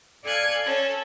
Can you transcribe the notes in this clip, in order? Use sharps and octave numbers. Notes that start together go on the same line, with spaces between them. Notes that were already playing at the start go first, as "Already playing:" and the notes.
A4 D5 F5 G#5 F#6 G#6
C#4 A4